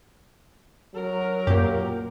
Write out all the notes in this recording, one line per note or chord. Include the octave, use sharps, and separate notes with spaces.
F#3 A#4
F#2 A#2 G4